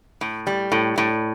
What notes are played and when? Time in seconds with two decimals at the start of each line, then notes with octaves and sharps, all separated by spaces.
0.21 A2
0.47 G3
0.72 A2
0.98 A2